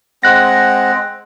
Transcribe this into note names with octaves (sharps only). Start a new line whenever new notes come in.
G#3 C4 F#5 F#6 A#6